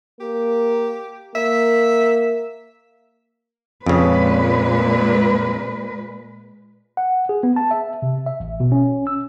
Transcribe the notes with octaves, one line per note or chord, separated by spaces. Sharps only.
A#3 G4
A#3 E5
F2 A#2 C#3 G#3 B4
F#5
G#4
B3
A5
E5
C3
E5
A1
B2
C#4
E6